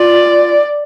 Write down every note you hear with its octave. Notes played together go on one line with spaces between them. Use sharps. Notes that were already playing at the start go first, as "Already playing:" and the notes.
Already playing: F4 D5